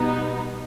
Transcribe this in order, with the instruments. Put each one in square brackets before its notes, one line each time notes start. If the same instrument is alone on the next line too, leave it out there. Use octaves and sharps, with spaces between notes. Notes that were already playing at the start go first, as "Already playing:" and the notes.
Already playing: [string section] B2 G3 B3 D#4